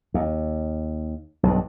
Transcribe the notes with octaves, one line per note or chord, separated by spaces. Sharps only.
D#2
B1 G2